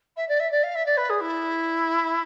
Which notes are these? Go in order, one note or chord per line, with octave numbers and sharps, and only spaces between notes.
E5
D5
E5
D5
F5
E5
D5
B4
G#4
E4